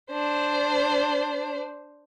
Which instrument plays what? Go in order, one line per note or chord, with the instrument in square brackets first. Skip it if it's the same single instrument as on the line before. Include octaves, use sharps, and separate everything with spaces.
[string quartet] D4 C5